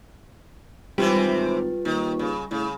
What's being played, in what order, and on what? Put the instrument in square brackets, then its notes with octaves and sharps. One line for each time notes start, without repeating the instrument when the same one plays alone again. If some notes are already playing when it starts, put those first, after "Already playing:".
[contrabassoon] G#1 [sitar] C3 E3 C4 [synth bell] G3 [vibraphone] F4 B4
[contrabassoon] D#2 [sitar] D#3
[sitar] C#3
[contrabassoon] A2 [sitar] C#3